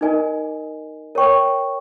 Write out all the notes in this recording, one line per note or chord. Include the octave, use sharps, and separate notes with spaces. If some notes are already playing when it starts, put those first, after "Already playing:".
D#4 A#4 D#5 G#5
A#4 C#5 G5 C#6